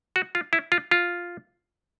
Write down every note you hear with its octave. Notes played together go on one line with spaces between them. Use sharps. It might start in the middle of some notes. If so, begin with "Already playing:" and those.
F#4
F4
E4
F4
F4